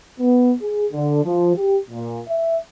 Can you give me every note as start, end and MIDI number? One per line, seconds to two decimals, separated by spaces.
0.20 0.54 59
0.61 0.86 68
0.93 1.22 50
1.24 1.52 53
1.55 1.77 67
1.90 2.20 46
2.28 2.57 76